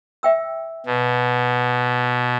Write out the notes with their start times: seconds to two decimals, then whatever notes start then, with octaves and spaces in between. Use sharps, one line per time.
0.23 E5 G5 E6
0.86 B2